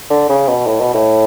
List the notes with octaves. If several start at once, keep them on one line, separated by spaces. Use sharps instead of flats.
D3
C#3
B2
A2
B2
A2